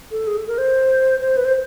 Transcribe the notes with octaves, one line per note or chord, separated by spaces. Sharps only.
A4
G#4
A4
A#4
C5
C5
B4
C5